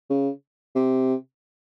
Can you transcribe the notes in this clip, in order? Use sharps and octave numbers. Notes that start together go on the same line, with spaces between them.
C#3
C3